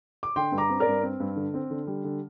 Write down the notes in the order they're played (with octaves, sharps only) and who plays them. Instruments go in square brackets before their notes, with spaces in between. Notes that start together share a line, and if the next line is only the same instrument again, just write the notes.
[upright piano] D6
D3 G5 C6
G2
A#5 D6
C4
A#4 D5
G2
C4
G2
D3
C4
D3
G3
D3